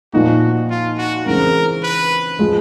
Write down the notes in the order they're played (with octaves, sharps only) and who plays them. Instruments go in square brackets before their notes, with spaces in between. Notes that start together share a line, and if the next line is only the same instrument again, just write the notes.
[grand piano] A#2 F3 A#3 D#4 [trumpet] F#4
[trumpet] F4
F#4
[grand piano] C#3 E3 G#3 C4 [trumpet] A#4
[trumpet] B4
[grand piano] F3 G#3